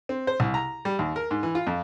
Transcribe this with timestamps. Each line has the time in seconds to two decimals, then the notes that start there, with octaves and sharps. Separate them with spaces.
0.09 C4
0.27 C5
0.40 C2
0.54 A#5
0.85 G3
0.99 D#2
1.16 A#4
1.31 G#2
1.43 E3
1.55 F4
1.67 F2